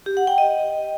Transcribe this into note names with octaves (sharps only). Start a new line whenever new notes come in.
G4
F#5
G5
D#5